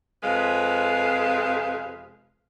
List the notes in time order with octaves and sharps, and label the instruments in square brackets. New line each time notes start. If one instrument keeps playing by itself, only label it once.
[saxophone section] F2 C3 G#3 B4 F5